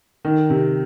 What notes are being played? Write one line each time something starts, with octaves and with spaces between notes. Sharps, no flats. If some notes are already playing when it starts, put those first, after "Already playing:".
D#3
C3